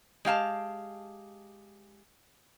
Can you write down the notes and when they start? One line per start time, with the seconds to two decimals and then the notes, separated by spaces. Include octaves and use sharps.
0.25 G#3 G4 F5 A5